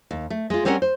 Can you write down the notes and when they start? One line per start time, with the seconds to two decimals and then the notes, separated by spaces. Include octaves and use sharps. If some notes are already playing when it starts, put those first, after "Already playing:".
0.11 D#2
0.30 A3
0.50 G#3 F4
0.65 G3 C4 C#4 A#4 F#5
0.82 C5